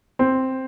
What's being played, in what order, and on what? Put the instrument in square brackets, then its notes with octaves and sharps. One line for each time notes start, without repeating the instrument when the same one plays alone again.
[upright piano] C4